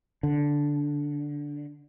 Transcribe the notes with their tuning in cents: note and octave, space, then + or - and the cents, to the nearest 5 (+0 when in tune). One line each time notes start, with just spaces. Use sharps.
D3 -10